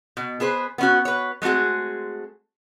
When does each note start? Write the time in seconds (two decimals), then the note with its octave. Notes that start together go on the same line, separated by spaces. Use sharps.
0.17 B2
0.40 B3 G#4 B4 C5
0.78 B3 C#4 F#4
1.05 B4 C#5
1.42 G#3 A3 C4 F#4 G#4